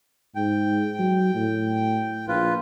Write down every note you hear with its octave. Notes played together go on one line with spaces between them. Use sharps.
G#2 G5
F#3
A2
A#1 F4 B4